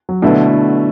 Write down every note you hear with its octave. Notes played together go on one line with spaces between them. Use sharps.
F#3
B2 D3 A3 E4 B4